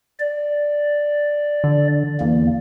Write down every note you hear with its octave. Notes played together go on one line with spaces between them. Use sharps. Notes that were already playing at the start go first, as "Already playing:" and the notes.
D5
D3
E2 A#3